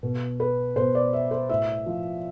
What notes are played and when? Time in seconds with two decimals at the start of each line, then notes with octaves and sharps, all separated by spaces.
0.03 B2
0.40 B4
0.76 B2 C5
0.95 D5
1.13 E5
1.31 C5
1.49 A2 E5
1.86 F3